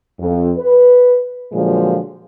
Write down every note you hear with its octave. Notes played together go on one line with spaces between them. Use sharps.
F2
B4
A#2 D3 F3 F#3 G#3